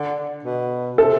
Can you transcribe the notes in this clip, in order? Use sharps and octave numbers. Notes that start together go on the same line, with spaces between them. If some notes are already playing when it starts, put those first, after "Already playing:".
Already playing: D3
B2
C3 A4